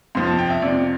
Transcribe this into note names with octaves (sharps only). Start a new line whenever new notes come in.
F2 C3 F3 C6
A5
G5
E5
F2 C3 F3 D5